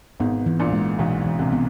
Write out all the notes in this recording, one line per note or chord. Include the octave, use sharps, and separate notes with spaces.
G#1 G#2 B3
E3
A#1 A#2
G#3
B1 B2 E3
E3
C2 C3
B3